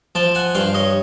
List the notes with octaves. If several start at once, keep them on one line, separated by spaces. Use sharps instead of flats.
F3 G5 A5
F#5 G#5
G2 F5 G5
C#5 D#5